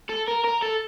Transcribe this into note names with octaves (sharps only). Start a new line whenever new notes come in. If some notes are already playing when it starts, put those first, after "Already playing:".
A4
A#4
A#4
A4